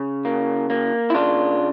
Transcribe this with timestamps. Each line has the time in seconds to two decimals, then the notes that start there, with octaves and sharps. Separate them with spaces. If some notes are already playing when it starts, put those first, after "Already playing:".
Already playing: C#3
0.25 A#3
0.70 A#3
1.10 E4
1.14 C#3 D4 F4